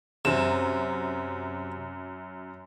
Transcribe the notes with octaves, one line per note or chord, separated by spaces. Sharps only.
F#2 C3 E7